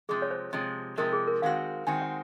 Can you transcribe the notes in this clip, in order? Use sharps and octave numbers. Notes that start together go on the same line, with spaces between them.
C3 F3 G#3 G#4
C#5
C5
C3 F3 G#3
C3 F3 G#3 A#4
G#4
A#4
D#3 G#3 C4 F#4 F5
D#3 G#3 C4 F#4 G#5
F#5